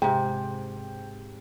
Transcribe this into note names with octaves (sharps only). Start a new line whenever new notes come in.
G#2 C3 G5